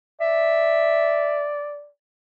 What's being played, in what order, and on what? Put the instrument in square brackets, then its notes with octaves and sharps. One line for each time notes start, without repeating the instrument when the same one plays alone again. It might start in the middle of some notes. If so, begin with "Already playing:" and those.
[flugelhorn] D5 [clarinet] E5